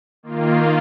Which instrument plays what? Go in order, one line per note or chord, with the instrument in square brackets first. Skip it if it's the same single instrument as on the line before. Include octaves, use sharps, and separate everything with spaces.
[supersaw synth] D#3 A#3 F4